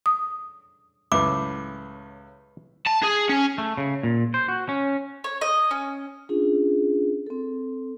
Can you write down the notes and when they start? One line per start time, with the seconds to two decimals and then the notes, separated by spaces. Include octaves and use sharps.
0.06 D#6
1.12 C#2 A2 B4 E5 D6
2.87 A5
3.03 G#4
3.30 C#4
3.58 A3
3.77 C#3
4.03 A#2
4.34 C5
4.48 F#4
4.69 C#4
5.24 C#5
5.41 D#5
5.71 C#4
6.29 C#4 D4 F4 G#4
7.27 C4 A4